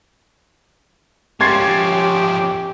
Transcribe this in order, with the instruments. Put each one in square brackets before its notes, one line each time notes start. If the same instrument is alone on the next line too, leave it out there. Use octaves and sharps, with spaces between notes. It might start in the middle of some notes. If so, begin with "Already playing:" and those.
[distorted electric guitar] F3 C#4 [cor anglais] G4 [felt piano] C6 A6 C7 [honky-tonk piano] G#6